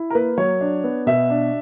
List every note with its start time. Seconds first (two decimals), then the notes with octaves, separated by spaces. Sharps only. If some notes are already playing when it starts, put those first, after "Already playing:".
Already playing: E4
0.10 A#4
0.15 A#3 B4
0.38 F#3 C#5
0.61 D4
0.84 B3
1.06 B2 E5
1.30 D4